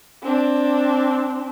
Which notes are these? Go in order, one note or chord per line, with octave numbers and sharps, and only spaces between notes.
C4 D4